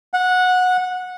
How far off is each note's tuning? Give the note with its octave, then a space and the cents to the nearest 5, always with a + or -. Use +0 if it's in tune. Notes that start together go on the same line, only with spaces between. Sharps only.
F#5 -15